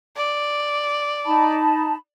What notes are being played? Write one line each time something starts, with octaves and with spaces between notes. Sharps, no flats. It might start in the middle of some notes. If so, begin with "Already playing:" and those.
D5
D#4 A5 B5